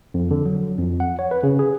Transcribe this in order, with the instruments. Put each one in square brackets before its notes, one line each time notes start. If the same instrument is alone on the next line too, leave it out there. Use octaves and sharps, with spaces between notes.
[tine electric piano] F2
D3
F#3
F2
F#5
C#5
B4
C#3
G#4